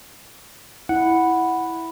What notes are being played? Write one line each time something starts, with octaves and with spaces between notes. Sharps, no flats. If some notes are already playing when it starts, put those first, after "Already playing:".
E4 F#5